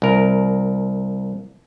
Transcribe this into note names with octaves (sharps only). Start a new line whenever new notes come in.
C2 A#4